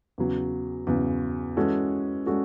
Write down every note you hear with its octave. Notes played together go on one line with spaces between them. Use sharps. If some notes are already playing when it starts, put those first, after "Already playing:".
E2 C#3 F#3
E2 C#3 F#3
E3 G#3 C#4 F#4 A4
G#3 C#4 F#4 A4